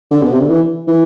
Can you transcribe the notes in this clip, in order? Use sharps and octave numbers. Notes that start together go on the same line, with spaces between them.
D3
B2
C3
D3
E3
E3